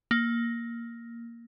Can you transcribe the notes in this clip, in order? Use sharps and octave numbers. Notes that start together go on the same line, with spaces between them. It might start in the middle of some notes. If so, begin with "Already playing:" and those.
A#3